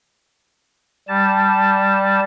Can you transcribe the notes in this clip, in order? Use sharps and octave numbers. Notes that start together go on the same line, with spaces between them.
G3 A5